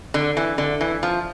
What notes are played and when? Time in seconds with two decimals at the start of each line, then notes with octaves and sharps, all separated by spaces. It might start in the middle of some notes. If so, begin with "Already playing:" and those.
0.14 D3
0.37 E3
0.58 D3
0.81 E3
1.03 F3